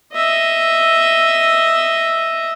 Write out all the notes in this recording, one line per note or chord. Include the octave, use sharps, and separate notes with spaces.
D#5 E5